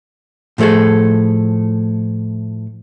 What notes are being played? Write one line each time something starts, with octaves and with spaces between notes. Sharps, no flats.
A2 F3 A3 G#4 A4